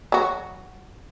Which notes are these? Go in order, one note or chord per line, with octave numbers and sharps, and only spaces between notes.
F#3 F#4